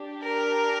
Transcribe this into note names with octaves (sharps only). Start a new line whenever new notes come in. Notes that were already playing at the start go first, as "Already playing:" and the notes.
Already playing: D4 G4
A#4